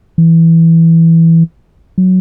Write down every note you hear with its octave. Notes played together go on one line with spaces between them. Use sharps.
E3
F#3